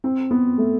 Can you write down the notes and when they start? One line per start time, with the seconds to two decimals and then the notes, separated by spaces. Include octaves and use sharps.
0.04 C4
0.31 B3
0.58 A3